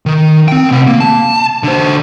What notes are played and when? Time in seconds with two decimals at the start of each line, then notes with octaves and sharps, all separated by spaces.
0.06 D#3
0.48 C4 G5
0.71 C3 F#5
0.87 A#3
1.00 A5
1.63 D3 C5